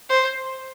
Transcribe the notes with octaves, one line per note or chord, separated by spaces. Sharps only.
C5